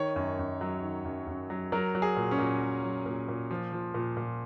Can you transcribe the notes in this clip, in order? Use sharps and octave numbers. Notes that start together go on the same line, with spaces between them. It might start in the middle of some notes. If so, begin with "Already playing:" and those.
Already playing: D#3 C#5
F#2
F#2
F#3
D#3
F#2
F#2
F#3
F#3 A#4
F#3
G#4
A#2
C#4
A#2
F#3
F#3
A#2
A#2
F3
F3
A#2
A#2